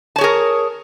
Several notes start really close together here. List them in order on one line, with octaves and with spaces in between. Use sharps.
A5 C#5 G#4 A#4